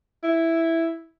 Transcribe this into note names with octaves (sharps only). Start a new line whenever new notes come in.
E4